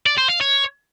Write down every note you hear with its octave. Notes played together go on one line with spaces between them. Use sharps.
D5
C5
F5
C#5